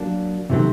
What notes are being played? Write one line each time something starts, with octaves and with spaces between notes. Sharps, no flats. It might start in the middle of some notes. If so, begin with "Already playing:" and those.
Already playing: F#3 A#3 D4
C3 D#3 F#3 A3 C4